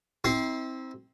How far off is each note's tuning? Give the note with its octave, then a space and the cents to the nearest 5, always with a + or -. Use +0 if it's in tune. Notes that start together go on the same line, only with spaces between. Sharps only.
C4 +0 E4 -45 C6 +0